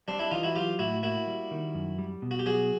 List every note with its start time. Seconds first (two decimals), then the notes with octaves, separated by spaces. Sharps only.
0.08 G3 C4 D4
0.19 D4 E4
0.31 E3 D#4 F4
0.43 E4 F#4
0.55 F#3 F4 G4
0.79 A2 E4 F#4
1.03 A#3 E4 F#4
1.27 G3
1.51 D#3
1.75 F#2
1.98 G3
2.22 B2
2.31 F#4
2.39 G4
2.46 F#3 F#4 G#4